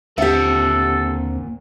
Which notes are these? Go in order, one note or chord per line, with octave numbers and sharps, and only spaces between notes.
D#2 A#2 D3 C4 G4 A4 E5 F#5